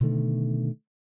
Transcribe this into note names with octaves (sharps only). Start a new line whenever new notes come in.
B2 D3 D#3 A3